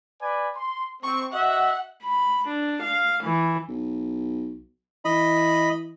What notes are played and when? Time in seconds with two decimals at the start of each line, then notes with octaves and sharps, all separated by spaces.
0.21 B4 D5 G#5
0.55 C6
1.03 C4 C#6
1.33 F#4 D#5 E5 F#5
2.02 B5
2.47 D4
2.81 F5
3.23 E3
3.69 B1
5.05 E3 D#5 B5